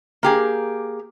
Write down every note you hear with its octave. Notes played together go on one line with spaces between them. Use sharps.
A#3 G4 G#4